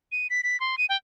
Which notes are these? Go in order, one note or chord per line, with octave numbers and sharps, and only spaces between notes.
D#7
B6
B6
C6
D#7
G5